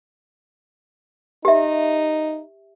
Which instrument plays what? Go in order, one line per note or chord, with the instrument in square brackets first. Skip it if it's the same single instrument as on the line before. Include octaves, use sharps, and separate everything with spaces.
[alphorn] D#4 [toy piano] G4 E5